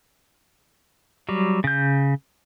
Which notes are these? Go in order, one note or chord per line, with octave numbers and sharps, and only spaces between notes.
F#3 G3
C#3 G6